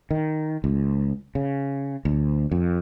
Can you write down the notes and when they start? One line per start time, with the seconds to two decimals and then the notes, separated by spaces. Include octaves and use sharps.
0.11 D#3
0.64 C#2
1.35 C#3
2.05 D2
2.51 F2